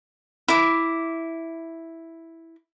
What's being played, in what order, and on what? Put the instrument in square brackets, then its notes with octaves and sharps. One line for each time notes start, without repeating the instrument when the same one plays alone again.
[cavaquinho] E4 D6